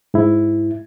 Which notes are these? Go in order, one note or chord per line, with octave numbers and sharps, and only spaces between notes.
G#2 E4